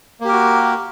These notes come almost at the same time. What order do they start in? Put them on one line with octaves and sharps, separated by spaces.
A#3 G4 A#4 F#4